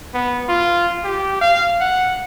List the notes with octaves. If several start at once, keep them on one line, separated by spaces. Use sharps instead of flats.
B3
F4
G4
F5
F#5